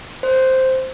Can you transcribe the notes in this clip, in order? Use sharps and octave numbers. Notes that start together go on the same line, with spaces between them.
C5